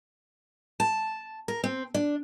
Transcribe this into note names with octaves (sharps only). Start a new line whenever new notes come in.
A5
A#4
C4
D4